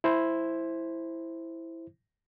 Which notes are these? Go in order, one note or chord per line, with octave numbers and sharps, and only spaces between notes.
E4 C5